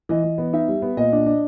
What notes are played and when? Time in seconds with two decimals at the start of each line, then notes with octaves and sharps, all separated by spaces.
0.09 E3 D#5
0.24 E3
0.38 B3
0.53 D#4 E5
0.68 G3
0.82 B3
0.97 A#2 D#5
1.12 D4
1.26 D4